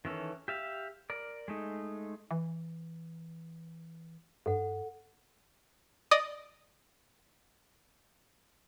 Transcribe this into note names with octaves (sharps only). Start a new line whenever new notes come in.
D#3 E3 C#4 A4
G4 E5 F5
A#4 D5
G#3 A3 D#4
E3
G2 A4 F#5
D5 D#5 D#6